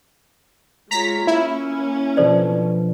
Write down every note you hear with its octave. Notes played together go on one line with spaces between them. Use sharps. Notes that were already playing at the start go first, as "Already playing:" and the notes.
G#3 F4 C#5 A#5 B6
A#3 C#4 E4
B2 F3 D4 A4 C5 D5